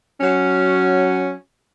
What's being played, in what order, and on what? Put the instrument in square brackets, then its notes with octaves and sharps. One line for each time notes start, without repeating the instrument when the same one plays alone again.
[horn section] F#3 C#4